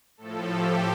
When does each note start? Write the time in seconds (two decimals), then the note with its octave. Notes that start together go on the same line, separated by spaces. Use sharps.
0.17 A2 F3 A4
0.49 G4